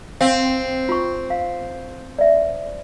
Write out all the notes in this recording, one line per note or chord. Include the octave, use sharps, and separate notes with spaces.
C4 F5
F4 C#6
F5
D5 E5